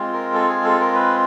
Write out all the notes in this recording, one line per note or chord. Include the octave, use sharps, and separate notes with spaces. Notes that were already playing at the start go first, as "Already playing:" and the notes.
Already playing: G#3 C4 F4
A#4
A4
G#4
A4
A#4
B4